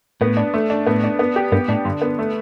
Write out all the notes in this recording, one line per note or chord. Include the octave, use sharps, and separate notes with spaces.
A2 B3
D4
A3
D4
A2 B3
D4
B3
G4
G2 B3
A2 D4
G2 D3
B3
A3